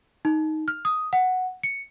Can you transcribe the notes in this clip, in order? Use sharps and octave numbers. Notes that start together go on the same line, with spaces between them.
D#4
F6
D#6
F#5
C#7